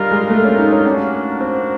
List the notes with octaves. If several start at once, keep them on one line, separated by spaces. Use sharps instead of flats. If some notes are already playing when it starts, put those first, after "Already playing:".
Already playing: G3 D4 F4 A#4 D#5
G#3
A3
C#4
D#4
C#4
A#3 C#4 D4 F#4
C4